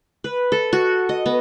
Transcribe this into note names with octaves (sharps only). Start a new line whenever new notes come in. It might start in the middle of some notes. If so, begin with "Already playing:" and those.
B4
A4
F#4
D#5
B3